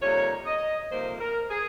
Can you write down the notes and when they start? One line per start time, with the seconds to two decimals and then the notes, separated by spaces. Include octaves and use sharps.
0.02 F2 C3 G3 A#3 D#4 C#5
0.46 D#5
0.90 F2 C3 G3 A#3 D#4 C5
1.21 A#4
1.50 G#4